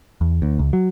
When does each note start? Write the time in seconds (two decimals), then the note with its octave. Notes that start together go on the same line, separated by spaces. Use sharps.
0.21 E2
0.42 D2
0.59 C#2
0.73 F#3